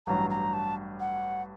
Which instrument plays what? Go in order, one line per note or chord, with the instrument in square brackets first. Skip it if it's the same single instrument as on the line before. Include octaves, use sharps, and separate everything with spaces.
[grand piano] A1 G2 F#3 [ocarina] A#5
[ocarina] A#5
A5
F#5